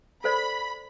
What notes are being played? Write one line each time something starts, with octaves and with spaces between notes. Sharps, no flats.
A4 C5 D5 B5